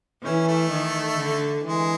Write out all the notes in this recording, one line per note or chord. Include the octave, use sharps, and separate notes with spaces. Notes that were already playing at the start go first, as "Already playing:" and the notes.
E3 C#4
A3
D#3
D3
E3 G#3